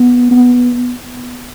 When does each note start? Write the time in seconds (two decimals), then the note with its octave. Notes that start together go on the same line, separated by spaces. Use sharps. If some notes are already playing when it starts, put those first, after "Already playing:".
Already playing: B3
0.31 B3